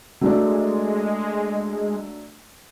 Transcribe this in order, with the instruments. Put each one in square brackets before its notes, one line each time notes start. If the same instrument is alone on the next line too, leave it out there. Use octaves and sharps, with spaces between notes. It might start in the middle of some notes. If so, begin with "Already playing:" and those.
[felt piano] F#3 A3 D4 [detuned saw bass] G#3